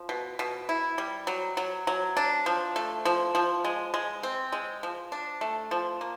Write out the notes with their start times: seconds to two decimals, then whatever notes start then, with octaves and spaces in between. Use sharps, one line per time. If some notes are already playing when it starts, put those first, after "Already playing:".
Already playing: F3
0.09 B2
0.39 B2
0.69 E4
0.98 G3
1.27 F#3
1.57 F#3
1.87 F#3
2.17 D4
2.46 F3
2.76 A3
3.05 F3
3.35 F3
3.64 G#3
3.94 G#3
4.23 C4
4.52 G#3
4.83 F3
5.12 D4
5.41 A3
5.71 F3
6.01 A#3